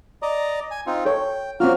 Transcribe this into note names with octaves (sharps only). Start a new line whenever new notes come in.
D5 D#5 A#5
G#5
C4 D#4 F4
A4 C#5 G5
A#3 C4 C#4 F4 F#4 F6